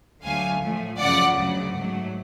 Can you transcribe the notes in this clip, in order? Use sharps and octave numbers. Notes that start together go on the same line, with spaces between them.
D2 D3 F#3 A3 F5 G#5
A2 F3 A3
F#2 C#3 F3 D5 F#5
D2 C#3 F#3
G#2 F#3 A3